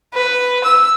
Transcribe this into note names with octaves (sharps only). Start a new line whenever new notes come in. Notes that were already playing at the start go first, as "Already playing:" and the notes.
B4
E6